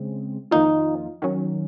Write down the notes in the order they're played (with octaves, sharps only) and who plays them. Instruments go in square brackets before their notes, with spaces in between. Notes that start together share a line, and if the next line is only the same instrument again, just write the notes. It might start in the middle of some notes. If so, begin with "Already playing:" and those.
Already playing: [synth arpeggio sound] C#3 G#3 C4
[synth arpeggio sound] F2 D#3 A#3 F4 [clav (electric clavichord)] D#4
[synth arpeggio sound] D#3 F#3 C#4